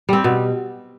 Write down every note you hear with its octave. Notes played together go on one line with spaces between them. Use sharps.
G3 C4
B2